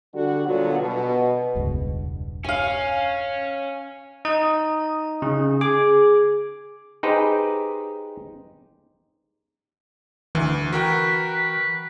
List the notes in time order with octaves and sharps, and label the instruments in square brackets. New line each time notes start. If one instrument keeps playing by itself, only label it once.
[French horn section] D3 G3 F#4
A#2 D3 F#3 G3 B3 F4
B2
[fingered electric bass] E1 C#2 G2
[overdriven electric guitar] C#4 [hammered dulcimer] F5 G#5
[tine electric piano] D#4 [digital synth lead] D#6
[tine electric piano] C#3 [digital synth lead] D#4
[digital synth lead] G#4 [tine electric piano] D6
[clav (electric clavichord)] D#4 G4 G#4 B4 C5
[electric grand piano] D2 [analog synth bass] E3
[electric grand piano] F#4 A#4 G5 [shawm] B4
[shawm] B4